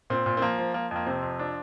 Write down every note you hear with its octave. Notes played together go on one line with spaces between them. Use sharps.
A#2 C4
A#2
C4
F3 A#3
F3
F3 A#3
F2 A#3
C3 C4
F2
F3 D4